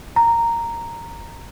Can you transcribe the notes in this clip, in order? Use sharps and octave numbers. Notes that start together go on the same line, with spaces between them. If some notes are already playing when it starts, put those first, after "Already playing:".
A#5